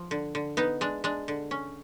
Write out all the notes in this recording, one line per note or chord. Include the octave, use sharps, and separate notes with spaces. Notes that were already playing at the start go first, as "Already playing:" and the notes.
Already playing: F3
D3
D3
B3 D#4
G#3 D4
G#3 D4
D3
C#4